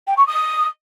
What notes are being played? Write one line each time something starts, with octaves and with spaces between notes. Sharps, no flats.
G5
C#6
D#6